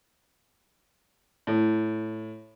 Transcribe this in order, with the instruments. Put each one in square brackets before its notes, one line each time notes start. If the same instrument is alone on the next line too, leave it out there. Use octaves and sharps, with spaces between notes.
[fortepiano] A2